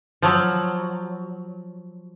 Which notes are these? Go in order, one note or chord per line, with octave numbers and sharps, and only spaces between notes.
F3 F#3